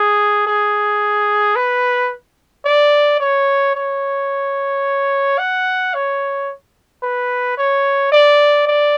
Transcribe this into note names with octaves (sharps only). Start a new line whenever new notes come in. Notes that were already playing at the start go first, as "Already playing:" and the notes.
Already playing: G#4
G#4
B4
D5
C#5
C#5
F#5
C#5
B4
C#5
D5
D5